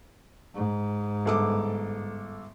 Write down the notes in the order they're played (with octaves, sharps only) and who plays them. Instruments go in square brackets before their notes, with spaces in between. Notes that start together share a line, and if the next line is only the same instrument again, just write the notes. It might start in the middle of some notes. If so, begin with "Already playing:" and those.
[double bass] G#2
[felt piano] G1 A4 D6